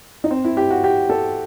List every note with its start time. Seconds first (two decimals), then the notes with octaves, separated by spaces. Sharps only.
0.24 D#4
0.31 C4
0.45 E4
0.57 G4
0.71 F#4
0.84 G4
1.10 A4